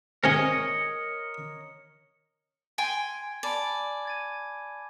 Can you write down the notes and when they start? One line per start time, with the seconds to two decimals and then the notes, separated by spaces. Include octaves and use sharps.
0.24 G#2 C3 G#4 A#4 C#5 D#5
2.78 G5 G#5 C6 G#6 A6 D7
3.43 D5 G#5 A5 B5
4.05 G#6 A6 D#7